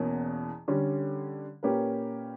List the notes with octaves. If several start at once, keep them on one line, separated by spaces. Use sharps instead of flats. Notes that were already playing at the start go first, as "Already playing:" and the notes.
Already playing: E2 B2 A#3 C#4
D3 G3 C#4
A#2 A#3 C#4 G4 B4